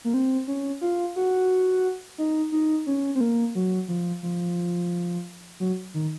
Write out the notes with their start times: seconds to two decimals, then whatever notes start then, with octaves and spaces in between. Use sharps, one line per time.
0.04 A#3
0.14 C4
0.48 C#4
0.81 F4
1.16 F#4
2.18 D#4
2.52 D#4
2.87 C#4
3.15 C4
3.21 A#3
3.55 F#3
3.88 F3
4.23 F3
5.60 F#3
5.94 D#3